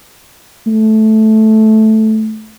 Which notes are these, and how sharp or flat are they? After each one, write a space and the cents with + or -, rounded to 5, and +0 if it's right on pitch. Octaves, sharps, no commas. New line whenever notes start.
A3 -10